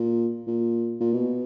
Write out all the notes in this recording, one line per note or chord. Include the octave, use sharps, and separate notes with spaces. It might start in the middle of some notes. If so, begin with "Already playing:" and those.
Already playing: A#2
A#2
A#2
B2